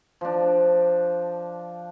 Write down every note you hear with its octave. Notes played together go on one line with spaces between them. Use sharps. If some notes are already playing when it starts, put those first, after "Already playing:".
F3 D4